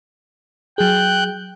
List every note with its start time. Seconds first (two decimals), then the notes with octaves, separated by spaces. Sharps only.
0.78 F#3 G#4 G5 F#6 G6